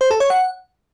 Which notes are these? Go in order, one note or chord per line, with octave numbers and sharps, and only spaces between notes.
C5
A4
C#5
F#5